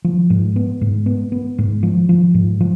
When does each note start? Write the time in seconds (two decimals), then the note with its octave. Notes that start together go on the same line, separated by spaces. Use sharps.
0.04 F3
0.30 G#2
0.56 B3
0.81 G#2
1.06 B3
1.32 B3
1.58 G#2
1.83 F3
2.09 F3
2.34 G#2
2.60 F3